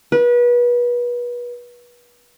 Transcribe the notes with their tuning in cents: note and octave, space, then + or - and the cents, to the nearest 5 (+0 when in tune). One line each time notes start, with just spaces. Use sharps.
B4 -30